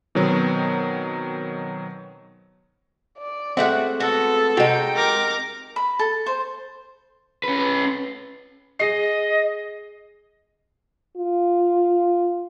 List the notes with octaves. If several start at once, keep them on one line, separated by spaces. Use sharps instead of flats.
B2 D#3 F#3 B3 C4
D5
G#3 A3 C4 F#4 E5 F#5
B3 F#4 A4
C3 G#3 D#4 F#4 G5
A#4 D6
B5
A4
C5
C#4 B4
G#4 D#5 C7
F4